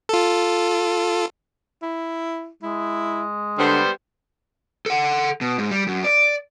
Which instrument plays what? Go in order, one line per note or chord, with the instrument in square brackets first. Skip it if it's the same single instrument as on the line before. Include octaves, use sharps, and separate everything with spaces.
[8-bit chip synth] F4 A4
[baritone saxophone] E4
[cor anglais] G#3 [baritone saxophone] E4
[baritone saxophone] D3 [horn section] G3 B3 C5
[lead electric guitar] A4 F#5
B2
G#2
G3
F#2
D5